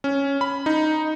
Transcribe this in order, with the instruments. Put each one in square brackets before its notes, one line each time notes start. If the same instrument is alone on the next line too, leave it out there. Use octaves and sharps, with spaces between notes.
[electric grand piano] C#4
B5
D#4